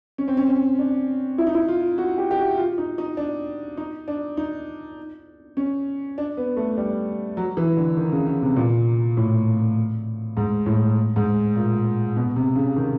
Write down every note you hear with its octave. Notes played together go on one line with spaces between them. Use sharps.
C#4
C4
C#4
C#4
D4
E4
D#4
E4
F4
F#4
G4
G4
F#4
F4
D#4
D#4
D4
D#4
D4
D#4
C#4
D4
B3
A3
G3
F#3
E3
D3
D#3
C#3
C#3
C3
A#2
A2
G#2
A2
G#2
A#2
B2
C3
C#3
D#3